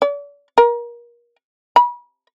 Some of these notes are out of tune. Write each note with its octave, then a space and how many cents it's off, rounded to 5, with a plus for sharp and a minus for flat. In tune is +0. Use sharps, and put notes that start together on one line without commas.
D5 -40
A#4 +30
B5 -35